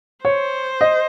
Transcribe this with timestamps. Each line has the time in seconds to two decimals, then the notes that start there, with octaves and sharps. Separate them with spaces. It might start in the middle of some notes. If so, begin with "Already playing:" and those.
0.25 C5 C#5
0.81 D#5